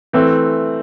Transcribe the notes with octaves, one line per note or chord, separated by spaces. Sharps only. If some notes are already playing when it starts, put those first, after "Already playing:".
E3 A3 C4